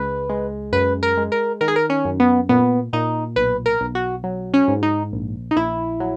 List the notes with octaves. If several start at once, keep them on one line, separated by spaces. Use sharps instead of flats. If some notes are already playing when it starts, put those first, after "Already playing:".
Already playing: C#2 G#3 B4
G#3
F#2 B4
A#4
G#3
A#4
D#3 A#4
G#4
A#4
C#4
F#2
B3
A#2 B3
A#2 D#4
B1 B4
A#4
B1
F#4
F#3
C#4
G#2
D#4
A#1
D#4
A#1 E4
F#3